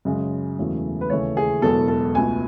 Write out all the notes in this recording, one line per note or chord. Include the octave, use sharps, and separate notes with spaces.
F#2 C#3 G#3
E1 E2 C#3 F#3 A3
B4
D#2 C#3 E3 A3 C#5
G#4
E1 E2 B2 F#3 A4
A4
C#2 B2 A3 G#5